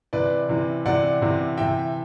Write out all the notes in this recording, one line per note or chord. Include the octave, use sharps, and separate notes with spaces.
C3 E3 B4 D5
C3 E3
C3 E3 D5 F#5
C3 E3
C3 E3 E5 G5